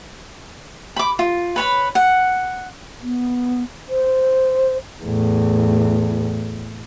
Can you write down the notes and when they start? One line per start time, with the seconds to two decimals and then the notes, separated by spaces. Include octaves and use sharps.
0.96 B5 D6
1.19 F4
1.56 B4 C#5 B5
1.95 F#5
3.02 B3
3.89 C5
5.03 E2 A2